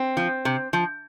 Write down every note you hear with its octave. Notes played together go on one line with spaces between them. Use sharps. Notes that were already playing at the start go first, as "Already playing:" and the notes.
Already playing: C4
F3
C3
F3